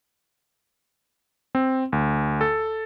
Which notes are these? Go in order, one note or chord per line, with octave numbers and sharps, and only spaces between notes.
C4
D2
A4